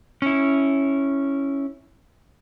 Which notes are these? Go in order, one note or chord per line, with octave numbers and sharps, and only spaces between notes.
C#4 E4